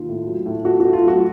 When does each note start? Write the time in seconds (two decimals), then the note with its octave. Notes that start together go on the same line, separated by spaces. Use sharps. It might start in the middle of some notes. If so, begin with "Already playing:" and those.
Already playing: D#2 F4
0.09 A2
0.27 F#3
0.46 A2
0.65 A3 F#4
0.80 A3 F#4
0.93 F4
1.03 F#3 F#4